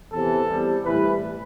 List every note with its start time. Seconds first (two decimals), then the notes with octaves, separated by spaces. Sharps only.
0.12 E2 C3 E3 A4
0.49 E2 C3 G3
0.86 A2 E3 G3 B4